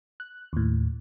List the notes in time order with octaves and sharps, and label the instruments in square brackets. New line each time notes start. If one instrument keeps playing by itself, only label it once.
[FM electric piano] F#6
D#2 A2